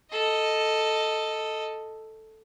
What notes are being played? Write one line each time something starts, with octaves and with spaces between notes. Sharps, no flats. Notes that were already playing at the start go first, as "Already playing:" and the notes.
A4 D#5